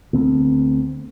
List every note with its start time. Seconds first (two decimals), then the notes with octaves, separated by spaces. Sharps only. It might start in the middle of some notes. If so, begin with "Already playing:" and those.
0.13 D2 B3 C4